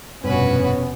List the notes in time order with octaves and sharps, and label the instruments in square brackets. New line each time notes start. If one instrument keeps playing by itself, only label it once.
[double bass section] F1 B2 C#4 [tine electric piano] G2 [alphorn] B3 [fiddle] F#4 B4